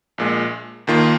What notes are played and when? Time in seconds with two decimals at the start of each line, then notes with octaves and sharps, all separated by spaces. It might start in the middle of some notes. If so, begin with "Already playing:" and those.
0.18 A#1 A#2 G#3
0.87 D#2 D#3 A#3 F4